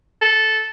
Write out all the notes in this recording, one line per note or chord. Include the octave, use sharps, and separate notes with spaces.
A4